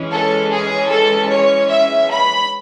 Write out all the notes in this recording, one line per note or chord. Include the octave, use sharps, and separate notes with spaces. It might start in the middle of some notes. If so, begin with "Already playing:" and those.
Already playing: E3 G#3 C#4
A4
G#4
A4
C#5
E5
B5